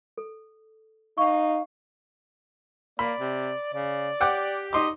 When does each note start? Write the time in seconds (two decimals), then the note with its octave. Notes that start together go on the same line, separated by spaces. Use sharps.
0.18 A4
1.18 D#4 F5 C#6
2.99 A#3 D5 B5
3.20 C3
3.74 C#3 D5
4.21 G4 F#5 G5 D6
4.73 D#4 D#5 C6 D6